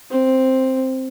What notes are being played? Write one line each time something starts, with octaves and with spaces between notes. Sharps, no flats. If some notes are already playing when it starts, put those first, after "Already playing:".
C4